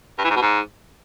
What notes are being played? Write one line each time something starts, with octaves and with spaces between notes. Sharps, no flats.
G2
E3
G#2
B2
G#2